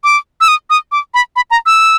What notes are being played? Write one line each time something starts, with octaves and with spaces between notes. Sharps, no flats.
D6
E6
D#6
D#6
D6
B5
B5
A#5
E6